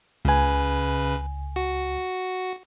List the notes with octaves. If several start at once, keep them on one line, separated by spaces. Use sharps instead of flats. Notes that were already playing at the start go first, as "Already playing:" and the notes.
C#2 C#3 B4 G#5
F#4